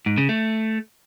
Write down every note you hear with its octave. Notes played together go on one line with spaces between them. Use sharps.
G#2
C#3
A3